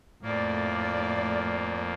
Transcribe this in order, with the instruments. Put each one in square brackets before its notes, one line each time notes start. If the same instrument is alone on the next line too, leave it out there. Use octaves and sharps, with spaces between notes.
[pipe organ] F2 A#3 [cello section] A2 D5